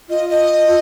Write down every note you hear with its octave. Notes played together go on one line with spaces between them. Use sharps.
F4 D#5
D#5